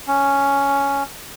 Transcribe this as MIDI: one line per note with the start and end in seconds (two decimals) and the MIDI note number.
0.08 1.03 61